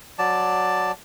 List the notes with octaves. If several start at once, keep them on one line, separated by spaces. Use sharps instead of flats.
F#3 D5 A5